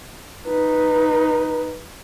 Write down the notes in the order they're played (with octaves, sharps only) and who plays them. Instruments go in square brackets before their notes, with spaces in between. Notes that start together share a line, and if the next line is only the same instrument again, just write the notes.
[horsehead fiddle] D#4 B4